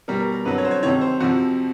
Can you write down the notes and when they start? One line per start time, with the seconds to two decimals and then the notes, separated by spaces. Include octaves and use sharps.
0.08 B2 G3 A#4
0.20 A#4
0.32 A#4
0.45 F2 D3 F#3 B4
0.58 C#5
0.65 C5
0.71 C#5
0.83 F2 C3 D#3 C#5
1.01 C5
1.20 F2 C3 F3 F#4